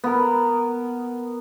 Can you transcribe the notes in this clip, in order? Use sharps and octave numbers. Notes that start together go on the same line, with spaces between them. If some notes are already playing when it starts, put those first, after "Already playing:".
B3 A#4